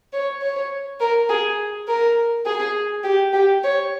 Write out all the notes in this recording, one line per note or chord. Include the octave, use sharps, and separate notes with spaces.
C#5
C#5
A#4
G#4
A#4
G#4
G4
G4
C#5